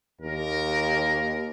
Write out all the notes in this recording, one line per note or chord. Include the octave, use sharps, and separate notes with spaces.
D#2 A#4